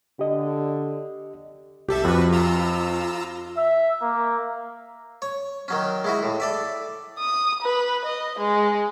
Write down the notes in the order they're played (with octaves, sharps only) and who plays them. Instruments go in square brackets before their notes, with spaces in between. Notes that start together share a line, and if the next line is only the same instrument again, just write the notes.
[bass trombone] D3 [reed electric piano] G4 D#5
[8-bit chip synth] C2 A4 E5 [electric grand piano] G4
[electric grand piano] F2 [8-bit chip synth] F#4 B4
[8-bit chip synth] F4 A#5 E6
[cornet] E5
A#3
[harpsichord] C#5
D#3 F#3 C#4
G#3 E4 F#4
A2
A4 D5 E5
[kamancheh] D#6
B4
D#5
G#3